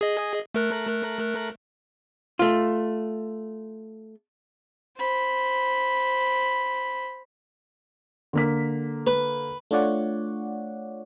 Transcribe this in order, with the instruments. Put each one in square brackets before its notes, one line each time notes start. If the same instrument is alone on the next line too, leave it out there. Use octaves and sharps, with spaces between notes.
[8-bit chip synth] G#4 D#5
A3 A#4 F#6
[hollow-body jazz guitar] A3 F4
[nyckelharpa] C5 B5
[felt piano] D3 A#3 B6
[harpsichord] B4
[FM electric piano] A3 D4 F4 C#5 D5 F#5